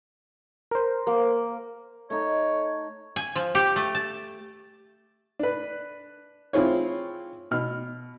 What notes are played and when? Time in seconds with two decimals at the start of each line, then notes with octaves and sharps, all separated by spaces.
0.71 A#4 C5
1.07 A#3
2.10 A3 D#4 C#5
3.16 G#5
3.36 F3
3.55 G4
3.76 A3
3.95 A5
5.39 D4 B4
6.53 C4 E4 F4 G#4 C5 C#5
7.51 B2 F6